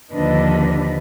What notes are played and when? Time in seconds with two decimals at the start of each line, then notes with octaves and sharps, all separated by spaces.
0.10 D#2 D3 F3 D4 B4 D#5